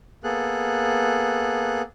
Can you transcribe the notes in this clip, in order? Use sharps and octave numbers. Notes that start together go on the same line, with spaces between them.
A#3 B3 G#4 A4 F#6